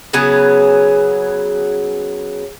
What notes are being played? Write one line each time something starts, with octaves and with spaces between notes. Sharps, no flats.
C#3 F#3 B3 G#4